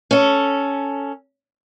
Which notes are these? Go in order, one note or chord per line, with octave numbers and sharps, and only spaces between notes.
C#4 A4